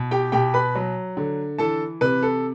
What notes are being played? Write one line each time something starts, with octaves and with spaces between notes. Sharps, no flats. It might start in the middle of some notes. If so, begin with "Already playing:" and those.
Already playing: B2
G4 G5
B2 G4 G5
B4 B5
F#3
D3
E3 A4 A5
C3 B4
A4